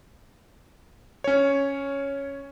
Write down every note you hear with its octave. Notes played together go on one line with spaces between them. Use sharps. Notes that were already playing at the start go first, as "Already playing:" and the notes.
C#4 C#5